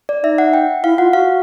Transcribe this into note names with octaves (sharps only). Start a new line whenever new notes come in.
D5
D#4 E5
F#5
G5
E4 F5
F4 F#5
F#4 F5